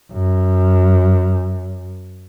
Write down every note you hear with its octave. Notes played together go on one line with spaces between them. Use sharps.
F#2